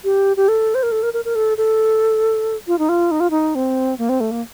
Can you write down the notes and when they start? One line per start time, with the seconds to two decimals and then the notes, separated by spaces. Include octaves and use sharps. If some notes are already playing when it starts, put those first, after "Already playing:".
0.04 G4
0.37 G4
0.48 A4
0.75 C5
0.83 A#4
0.92 A4
1.03 A#4
1.14 A#4
1.25 A#4
1.35 A4
1.58 A4
2.67 F4
2.79 D#4
2.89 F4
3.11 D#4
3.20 F4
3.30 D#4
3.55 C4
3.98 A#3
4.09 C4
4.20 A3
4.31 A#3